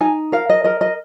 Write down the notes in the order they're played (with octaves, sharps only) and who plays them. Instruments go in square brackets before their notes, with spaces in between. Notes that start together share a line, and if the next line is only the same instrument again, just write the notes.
[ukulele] D#4 G#5
A#4 F5
D#5
A#4 D#5
D#5